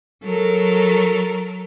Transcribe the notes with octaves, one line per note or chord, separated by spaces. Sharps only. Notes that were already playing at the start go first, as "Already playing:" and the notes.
F#3 A4 A#4